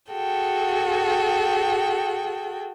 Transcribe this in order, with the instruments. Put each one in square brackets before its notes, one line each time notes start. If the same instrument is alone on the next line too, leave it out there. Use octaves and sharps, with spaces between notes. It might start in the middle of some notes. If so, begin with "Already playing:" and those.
[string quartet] F#4 G#4 A4 G5